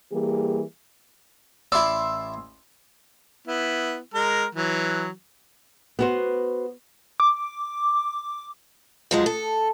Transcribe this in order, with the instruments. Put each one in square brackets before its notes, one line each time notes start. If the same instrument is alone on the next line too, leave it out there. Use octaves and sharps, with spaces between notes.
[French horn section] E3 G3 A#3 G4 G#4
[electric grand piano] A1 C6 E6 [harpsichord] E4 D5
[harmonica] B3 E4
G#3 A#4
E3 F#3
[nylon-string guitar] B3 F#4 C5
[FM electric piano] D6
[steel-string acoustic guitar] F3 F#3 G#3
A4